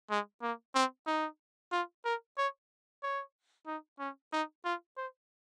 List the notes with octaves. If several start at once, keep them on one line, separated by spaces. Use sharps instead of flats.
G#3
A#3
C4
D#4
F4
A#4
C#5
C#5
D#4
C#4
D#4
F4
C5